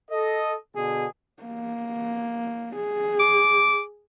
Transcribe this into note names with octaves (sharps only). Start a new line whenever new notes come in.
A4 D#5
B2 D3 G#4
A#3
G#4
D6